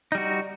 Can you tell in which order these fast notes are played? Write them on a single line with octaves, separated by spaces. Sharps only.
D#4 G3 F#4